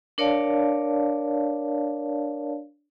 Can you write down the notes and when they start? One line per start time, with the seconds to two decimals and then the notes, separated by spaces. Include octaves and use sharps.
0.18 D4 A#4 C#5 D5 F5 A5